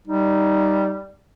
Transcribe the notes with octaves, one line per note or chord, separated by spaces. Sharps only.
G3 D#4